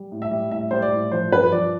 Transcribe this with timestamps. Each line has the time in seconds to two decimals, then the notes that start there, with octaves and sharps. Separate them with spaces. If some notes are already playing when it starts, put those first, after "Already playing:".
Already playing: G3
0.12 A2
0.22 E5
0.31 G3
0.51 A2 E5
0.71 G3 C5
0.82 D5
0.92 A2
1.11 F3 C5
1.32 G2 B4
1.52 F3 D5